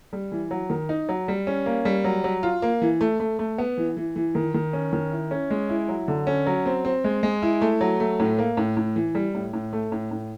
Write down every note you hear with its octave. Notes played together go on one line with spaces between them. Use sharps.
G3
E3
F#3
D#3
D#4
F#3
G3
C#4
A#3
G3
F#3
F#3
F4
A#3
E3
A3
A3
A3
B3
E3
E3
E3
D#3
D#3
C#4
D#3
E4
C#4
G#3
E4
F#3
D3
C#4
F#3
C4
C4
G#3
G#3
E4
A3
F#3
A3
A2
A#3
A2
A2
E3
G3
A2
A2
A3
A2
A2